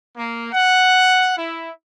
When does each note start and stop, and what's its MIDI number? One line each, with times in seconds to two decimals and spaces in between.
0.17 0.49 58
0.53 1.34 78
1.37 1.70 64